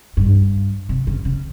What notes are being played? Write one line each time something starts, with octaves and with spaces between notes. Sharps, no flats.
G2
C3
C#3
C#3